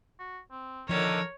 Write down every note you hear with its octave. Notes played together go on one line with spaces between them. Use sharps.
F#4
C4
A#2 D3 D#3 F3 A#4 C#5